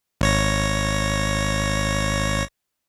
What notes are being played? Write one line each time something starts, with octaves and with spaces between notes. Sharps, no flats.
G#1 C#5 A#6